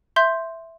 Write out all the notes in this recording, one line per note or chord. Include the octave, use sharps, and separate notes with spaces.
E5 C6 G6